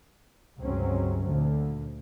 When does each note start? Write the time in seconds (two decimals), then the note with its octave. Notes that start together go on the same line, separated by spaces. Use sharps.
0.60 C#2 G2 C3 F#3 C4 C#4
1.28 D2 A#2 D3